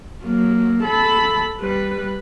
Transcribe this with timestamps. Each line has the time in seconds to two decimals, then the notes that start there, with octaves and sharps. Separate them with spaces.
0.23 F#3 A#3
0.84 A4 B5
1.61 G3 B4